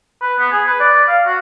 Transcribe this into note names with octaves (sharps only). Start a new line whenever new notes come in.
B4
B3
G#4
B4
D5
F5
F#4